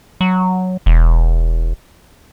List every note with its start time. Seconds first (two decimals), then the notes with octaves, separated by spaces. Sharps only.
0.21 F#3
0.86 E1